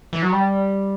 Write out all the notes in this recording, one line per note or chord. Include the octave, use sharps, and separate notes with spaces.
E3
F#3
G3